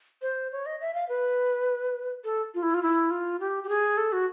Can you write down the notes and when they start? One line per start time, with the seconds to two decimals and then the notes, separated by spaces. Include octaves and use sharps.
0.22 C5
0.52 C#5
0.66 D#5
0.81 E5
0.94 F5
1.09 B4
2.24 A4
2.55 F4
2.63 E4
2.74 F4
2.83 E4
3.11 F4
3.40 G4
3.64 G4
3.69 G#4
3.98 A4
4.12 F#4